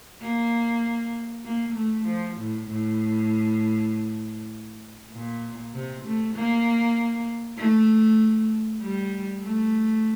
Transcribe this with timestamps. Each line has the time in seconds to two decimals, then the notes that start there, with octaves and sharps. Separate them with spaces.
0.21 A#3
1.44 A#3
1.75 A3
2.05 F3
2.37 A2
2.67 A2
5.12 A#2
5.73 C3
6.05 A3
6.35 A#3
7.57 A3
8.80 G3
9.42 A3